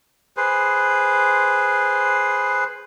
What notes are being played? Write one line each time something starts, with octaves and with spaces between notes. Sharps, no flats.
G#4 B4 C5